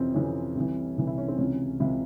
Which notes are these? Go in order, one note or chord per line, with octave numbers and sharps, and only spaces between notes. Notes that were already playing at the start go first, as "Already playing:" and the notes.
Already playing: F2 C3 E3 C4 C#4
F2 C3 E3 C#4
C2 C3 E3
C2 C3 E3
E4
C#4
C4
C#2 C3 E3 C#4
C#2 C3 E3 E4